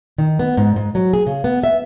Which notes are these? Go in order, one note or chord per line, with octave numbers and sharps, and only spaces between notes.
D#3
B3
G#2
G#2
F#3
G#4
C#3
B3
E5